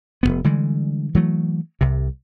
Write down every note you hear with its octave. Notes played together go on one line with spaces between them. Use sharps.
F1 E2 B3
D3 E3 G3 G#3
E3 F#3 A3
C2 C3